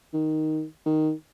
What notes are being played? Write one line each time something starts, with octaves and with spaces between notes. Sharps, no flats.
D#3
D#3